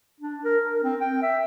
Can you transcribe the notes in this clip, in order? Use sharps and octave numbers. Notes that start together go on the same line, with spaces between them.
D4
A#4
A#4
C4
G5
E5